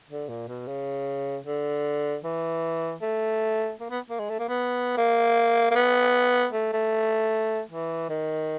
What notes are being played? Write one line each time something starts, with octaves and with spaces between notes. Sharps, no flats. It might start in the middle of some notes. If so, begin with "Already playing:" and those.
D3
A#2
B2
C#3
D3
E3
A3
A#3
B3
A#3
G#3
A3
A#3
B3
A#3
A#3
B3
A3
A3
E3
D#3